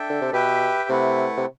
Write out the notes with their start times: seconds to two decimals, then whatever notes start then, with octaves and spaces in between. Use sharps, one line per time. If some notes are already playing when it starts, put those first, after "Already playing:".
Already playing: D4 A4 E5 G5
0.10 D3
0.21 C3
0.32 B2 G4 B4 E5 G5
0.89 C3 A3 E4 B4 F#5
1.37 C3